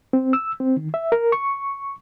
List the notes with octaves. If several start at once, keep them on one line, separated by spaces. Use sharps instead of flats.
C4
E6
C4
D#3
E5
A#4
C#6